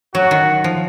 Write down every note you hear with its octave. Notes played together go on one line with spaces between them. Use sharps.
F#3 F#4
D#3
F3